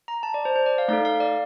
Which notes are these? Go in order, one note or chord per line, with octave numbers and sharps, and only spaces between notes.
A#5
A5
D5
C5
C5
D5
F5
A3 D#4 A4 F5
F5
D5